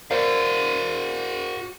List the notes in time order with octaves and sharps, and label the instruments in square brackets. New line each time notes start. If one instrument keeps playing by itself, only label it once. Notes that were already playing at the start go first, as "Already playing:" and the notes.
[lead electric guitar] F#4 F5 [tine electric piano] A#4 C5 D5